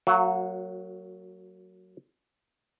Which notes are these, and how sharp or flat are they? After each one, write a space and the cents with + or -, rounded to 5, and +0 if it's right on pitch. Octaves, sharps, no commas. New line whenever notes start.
F#3 +0 A#3 -35 F#4 -25